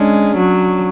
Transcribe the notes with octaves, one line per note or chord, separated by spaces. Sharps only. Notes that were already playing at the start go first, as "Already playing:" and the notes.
Already playing: G#3 C#4 D4
F#3